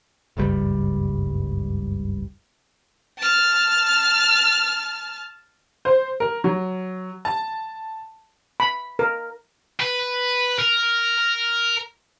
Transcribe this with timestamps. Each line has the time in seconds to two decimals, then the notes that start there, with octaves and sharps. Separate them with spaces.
0.37 F#1 C#2 G2 G3
3.18 A5 F6
5.85 C5
6.20 A#4
6.44 F#3
7.25 A5
8.60 B5
8.99 A#4
9.80 B4
10.59 A#4